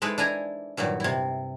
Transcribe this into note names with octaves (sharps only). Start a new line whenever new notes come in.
G#3 D#4 E4 A4 B4 C5
D4 E4 G#5 A#5
G2 A#2 D#3 F#3
C3 E4